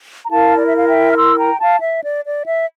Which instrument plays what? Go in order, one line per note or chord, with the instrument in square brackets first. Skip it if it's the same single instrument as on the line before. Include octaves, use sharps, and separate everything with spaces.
[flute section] A#5
E4 A#4 F5 A5
D5
E5
F5
E5 G5
F6
C6 E6
G5 A#5
F5 A5
E5
D5
D5
E5